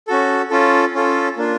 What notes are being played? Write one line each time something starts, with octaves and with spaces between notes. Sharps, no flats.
C#4 F#4 A4
C#4 F4 A4
C#4 F4 A4
A#3 D4 F4